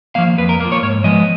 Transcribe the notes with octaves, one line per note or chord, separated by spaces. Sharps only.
F3 A#3 F5
F2 B4
A#4
F3 A#3
C#5
G#2 C#5
F3 G#3 B3 D#5